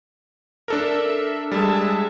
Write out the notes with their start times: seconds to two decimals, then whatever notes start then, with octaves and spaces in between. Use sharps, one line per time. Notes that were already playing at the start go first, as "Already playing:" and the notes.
0.68 D4 A4 A#4 E5
1.52 G3 G#3 E5 A5